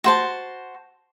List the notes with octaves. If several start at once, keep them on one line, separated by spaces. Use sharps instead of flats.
F#4 C5 A5